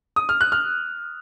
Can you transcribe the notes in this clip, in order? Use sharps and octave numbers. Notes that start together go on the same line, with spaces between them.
D#6
F6
F#6
F6